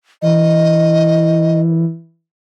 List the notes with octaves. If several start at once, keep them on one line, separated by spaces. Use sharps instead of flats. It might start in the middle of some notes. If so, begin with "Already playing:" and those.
E3 D#5